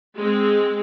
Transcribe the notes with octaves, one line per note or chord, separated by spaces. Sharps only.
G#3 C4